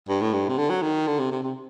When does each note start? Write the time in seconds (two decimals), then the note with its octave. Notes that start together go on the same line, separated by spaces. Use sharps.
0.08 G2
0.21 A2
0.33 G2
0.48 C3
0.58 D3
0.70 F#3
0.82 D#3
1.07 D3
1.19 C3
1.31 C3
1.43 C3